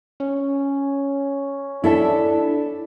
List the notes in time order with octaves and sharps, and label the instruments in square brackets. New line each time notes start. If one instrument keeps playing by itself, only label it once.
[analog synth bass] C#4
[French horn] D4 [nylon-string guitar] E4 A4 E5